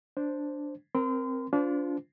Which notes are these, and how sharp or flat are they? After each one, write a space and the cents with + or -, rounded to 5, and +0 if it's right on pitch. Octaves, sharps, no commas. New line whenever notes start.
D4 +0 C5 +0
C4 +0 A#4 +10 C6 -35
D4 -30 F4 +0 C5 -40